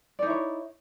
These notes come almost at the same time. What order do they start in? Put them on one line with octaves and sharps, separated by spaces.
D5 D#4 E4 C#5